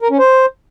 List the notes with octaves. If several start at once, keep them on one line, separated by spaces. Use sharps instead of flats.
A#4
C#4
C5